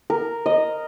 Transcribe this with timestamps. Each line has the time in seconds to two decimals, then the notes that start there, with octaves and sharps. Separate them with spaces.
0.10 A#4
0.46 D#5